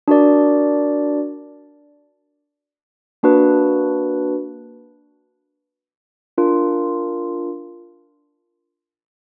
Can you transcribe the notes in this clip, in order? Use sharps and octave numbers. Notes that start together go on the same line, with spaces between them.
D4 F#4 A#4 D5
A#3 D4 F#4 B4
D4 F4 A#4